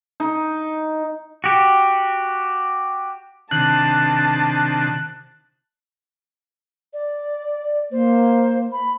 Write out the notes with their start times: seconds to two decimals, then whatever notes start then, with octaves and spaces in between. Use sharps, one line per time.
0.20 D#4
1.44 F#4 G4
3.51 C3 D#3 D4 A5 F#6
6.93 D5
7.91 A#3 C5
8.72 B5